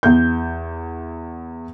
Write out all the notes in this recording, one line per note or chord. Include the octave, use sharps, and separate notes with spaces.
E2 G6